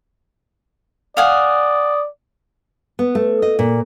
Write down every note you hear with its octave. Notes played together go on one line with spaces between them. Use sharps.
D5 F5 F#5 G#5 D#6
B3
A3
D#5
A#2